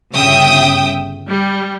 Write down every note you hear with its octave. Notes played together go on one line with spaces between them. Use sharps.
G1 C#3 E5 G5 D#6
G3